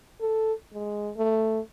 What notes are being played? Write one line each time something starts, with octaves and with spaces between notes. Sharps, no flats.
A4
G#3
A3